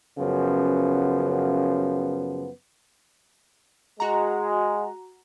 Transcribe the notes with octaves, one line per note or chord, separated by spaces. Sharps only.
F#2 C#3 F3 B3
G#3 F#4 F#5 A#5